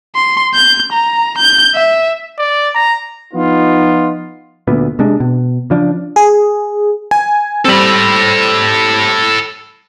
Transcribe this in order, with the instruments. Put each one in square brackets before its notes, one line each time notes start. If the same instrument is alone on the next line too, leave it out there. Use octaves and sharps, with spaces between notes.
[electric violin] C6
G6
A#5
G6
E5
[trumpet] D5
A#5
[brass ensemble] F3 B3 D#4 F4
[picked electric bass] D2 A#2 B3
C3 G#3 D4
B2
C#3 F3 D4
[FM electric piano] G#4
[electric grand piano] G#5
[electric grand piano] G3 C4 [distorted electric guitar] A4 B5